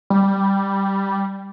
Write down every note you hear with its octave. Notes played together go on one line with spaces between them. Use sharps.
G3